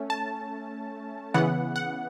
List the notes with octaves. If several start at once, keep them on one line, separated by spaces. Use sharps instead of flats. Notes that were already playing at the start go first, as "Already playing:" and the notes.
Already playing: A3 C#4
A5
C#3 E3 B3 F#5
F#5